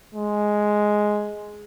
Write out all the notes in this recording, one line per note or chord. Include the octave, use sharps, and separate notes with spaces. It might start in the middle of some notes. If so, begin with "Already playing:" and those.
G#3